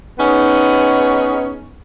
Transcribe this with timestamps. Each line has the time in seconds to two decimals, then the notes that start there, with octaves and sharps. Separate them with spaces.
0.19 B3 C#4 D#4 G#4